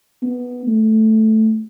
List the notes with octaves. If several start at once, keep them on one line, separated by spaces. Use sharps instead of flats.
B3
A3